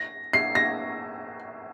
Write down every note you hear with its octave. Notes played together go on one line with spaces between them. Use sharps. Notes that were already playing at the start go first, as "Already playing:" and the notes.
Already playing: A#6
C7
A#6